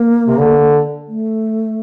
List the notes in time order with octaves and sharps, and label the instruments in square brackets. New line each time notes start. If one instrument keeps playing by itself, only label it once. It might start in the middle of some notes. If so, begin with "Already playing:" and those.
Already playing: [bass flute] A#3
[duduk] C3
D3
[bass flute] A3